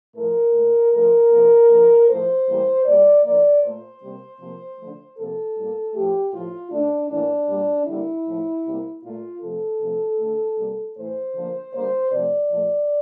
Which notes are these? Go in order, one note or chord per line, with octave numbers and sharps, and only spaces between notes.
A2 F3 A3 A#4
A#2 A3
D3 F3 A3 A#4
C3 F3 A#3
D3 F3 A#3
A2 F3 A3 C5
A2 E3 G3 A#3
A#2 G3 A#3 D5
D3 F3 A#3 D5
A#2 A3 C5
C3 G3 A#3
C3 F3 A#3
D3 F3 A3
C3 F3 A#3 A4
A2 G3 A#3
A2 F3 A3 G4
A2 F3 A3 F4
D3 A3 D4
A2 E3 A#3 D4
A#2 G3 A#3
D3 G3 A#3 E4
A2 F3 A3
C3 G3 A#3
A#2 A3 F4
C3 F3 A3 A4
C3 F3 A3
D3 A3
C3 G3 A#3
A2 E3 A3 C5
D3 F3 A#3
D3 G3 A#3 C5
C3 F3 A3 D5
A#2 F3 A3